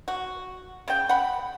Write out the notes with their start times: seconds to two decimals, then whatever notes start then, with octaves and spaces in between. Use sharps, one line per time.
0.08 F#4
0.88 C#3 G5
1.09 F#5 B5